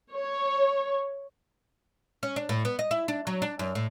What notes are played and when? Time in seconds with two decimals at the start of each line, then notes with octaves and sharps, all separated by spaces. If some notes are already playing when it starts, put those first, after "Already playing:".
0.13 C#5
2.23 C#4
2.36 D4
2.49 A2
2.65 B3
2.79 D#5
2.91 E4
3.08 D4
3.27 F#3
3.42 D4
3.59 F#2
3.75 A2